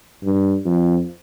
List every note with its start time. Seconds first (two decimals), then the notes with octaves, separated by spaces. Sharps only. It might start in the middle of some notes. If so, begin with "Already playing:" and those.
0.24 G2
0.66 F2